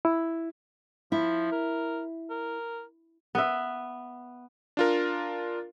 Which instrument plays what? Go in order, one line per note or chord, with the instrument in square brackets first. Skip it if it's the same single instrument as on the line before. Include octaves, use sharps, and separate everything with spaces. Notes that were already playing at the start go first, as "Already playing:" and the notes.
[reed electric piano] E4
[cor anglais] F3 [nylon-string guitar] E4
[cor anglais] A#4
A#4
[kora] B3 E5
[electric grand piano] D4 F4 A#4